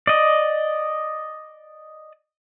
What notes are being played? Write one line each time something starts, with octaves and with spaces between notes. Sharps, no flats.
D5 D#5